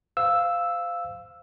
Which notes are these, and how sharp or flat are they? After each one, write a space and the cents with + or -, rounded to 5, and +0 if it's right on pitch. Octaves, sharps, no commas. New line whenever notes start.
C5 -25 F5 +0 E6 +0